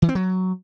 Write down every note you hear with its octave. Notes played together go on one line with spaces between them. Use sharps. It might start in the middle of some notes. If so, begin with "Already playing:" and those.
E3
C4
F#3